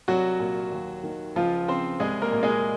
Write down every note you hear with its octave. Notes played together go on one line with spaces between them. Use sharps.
C2 F#3 F#4
A#2
D#2
D#3
C#2 F3 F4
C#3 C4 C5
C2 G#3 G#4
A#3 A#4
A#2
G#3 G#4